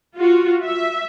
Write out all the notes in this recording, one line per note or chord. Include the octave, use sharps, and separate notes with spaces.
F4 F#4
E5